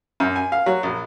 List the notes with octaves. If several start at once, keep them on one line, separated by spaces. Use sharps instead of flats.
F#2
G#5
F5
F#3
A#1